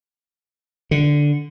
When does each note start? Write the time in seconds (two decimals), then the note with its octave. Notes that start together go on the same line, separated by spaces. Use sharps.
0.91 D3